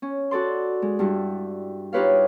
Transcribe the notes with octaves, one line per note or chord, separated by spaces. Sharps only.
C#4
F#4 A4 D5 C6
G#3
G2 G3 E4 F#4
D#4 F4 G4 B4 C#5 F5